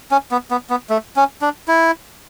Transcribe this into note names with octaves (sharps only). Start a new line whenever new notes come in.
C#4
B3
B3
B3
A3
C#4
D4
E4